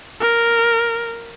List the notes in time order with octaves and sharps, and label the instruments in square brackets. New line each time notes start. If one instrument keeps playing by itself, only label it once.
[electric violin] A#4